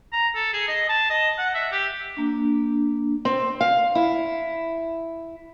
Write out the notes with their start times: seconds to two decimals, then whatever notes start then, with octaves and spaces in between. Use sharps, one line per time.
0.13 A#5
0.35 A4
0.53 G#4
0.68 D#5
0.89 A5
1.10 D#5
1.38 F#5
1.54 E5
1.72 G4
2.17 A#3 D4
3.25 C4
3.61 F5
3.95 E4